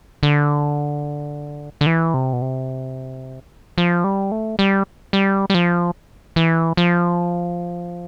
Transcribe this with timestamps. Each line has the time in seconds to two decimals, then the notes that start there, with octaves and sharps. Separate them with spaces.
0.23 D3
1.81 D3
1.86 E3
2.14 C3
2.33 B2
2.42 C3
3.78 F3
4.04 G3
4.32 A3
4.59 G3
5.13 G3
5.50 G3
5.54 F3
6.36 E3
6.77 F3